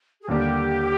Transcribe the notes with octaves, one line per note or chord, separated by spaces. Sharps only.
G#4
D#2 D3 G3 A#3 D4 G4